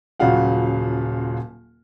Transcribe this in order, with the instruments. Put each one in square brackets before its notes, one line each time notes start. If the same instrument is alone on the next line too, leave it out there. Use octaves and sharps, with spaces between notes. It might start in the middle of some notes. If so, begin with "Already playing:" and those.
[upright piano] D#1 C#3 F#3 F4 F5 F#5